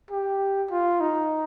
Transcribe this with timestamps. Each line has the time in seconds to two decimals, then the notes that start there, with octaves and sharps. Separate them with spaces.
0.11 G4
0.71 F4
1.00 D#4